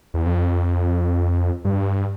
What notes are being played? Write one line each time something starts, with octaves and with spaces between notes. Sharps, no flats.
E2
F2
G2